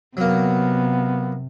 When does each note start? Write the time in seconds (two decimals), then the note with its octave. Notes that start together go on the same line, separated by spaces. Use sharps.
0.17 C3 F#3 A#3 B3